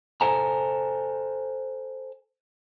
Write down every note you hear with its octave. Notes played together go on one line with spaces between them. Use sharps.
A4 C5 G#5 A#5